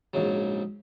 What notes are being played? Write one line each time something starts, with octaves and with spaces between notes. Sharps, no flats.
A#1 G#2 C#3 F#3